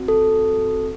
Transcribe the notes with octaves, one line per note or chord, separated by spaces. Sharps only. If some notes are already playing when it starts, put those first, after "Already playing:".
Already playing: C4 F#4
A4